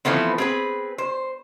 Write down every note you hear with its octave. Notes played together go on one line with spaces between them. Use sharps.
E3 F3 A3 B3 C4
C4 G#4 B4
C5